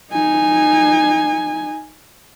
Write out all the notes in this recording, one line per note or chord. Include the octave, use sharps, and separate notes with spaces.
D#4 G#5